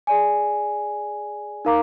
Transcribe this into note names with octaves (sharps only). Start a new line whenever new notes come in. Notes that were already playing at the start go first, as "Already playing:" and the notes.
G#4 D5 G#5
D#4 A#4 F5 A#5 D6